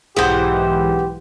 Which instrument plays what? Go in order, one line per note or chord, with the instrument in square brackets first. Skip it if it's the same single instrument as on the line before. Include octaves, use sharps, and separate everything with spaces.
[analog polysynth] B1 G#2 E3 [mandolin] B3 C5 [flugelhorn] G4 [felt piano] G#4 F#5